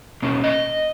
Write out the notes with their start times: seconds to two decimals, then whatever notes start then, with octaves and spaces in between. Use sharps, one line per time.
0.22 B2 A#3 C#4
0.44 D#5